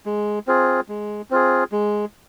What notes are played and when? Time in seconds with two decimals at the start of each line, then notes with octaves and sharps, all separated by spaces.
0.06 G#3
0.47 C4 F4 G#4
0.88 G#3
1.30 C4 F4 G#4
1.72 G#3